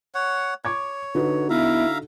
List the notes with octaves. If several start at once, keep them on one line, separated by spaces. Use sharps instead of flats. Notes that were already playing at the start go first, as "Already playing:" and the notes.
C#5 F#5
C#5 C#6 D6 G#6
D3 D#4 F#4 B4
B3 E4 E5 F5 A#5